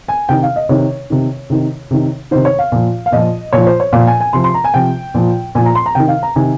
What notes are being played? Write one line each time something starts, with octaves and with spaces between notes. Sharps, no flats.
G#5
C3 D#3 G5
F5
D#5
C3 D#3 C#5
C3 D#3
C3 D#3
C3 D#3
C3 D#3 C5
C#5
F5
A#2 F3
F5
A#2 F3 D#5
A#2 F3 C#5
C5
C#5
A#2 F3 F5
G#5
G#5
C3 F3 C6
C6
A#5
G#5
C3 F3 G5
A#2 F3
A#2 F3 G#5
A#5
C6
A#5
C3 D#3 G5
F5
A#5
C3 D#3 G#5